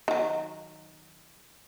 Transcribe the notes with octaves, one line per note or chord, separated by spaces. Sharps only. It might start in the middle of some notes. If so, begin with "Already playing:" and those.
D#3 F#3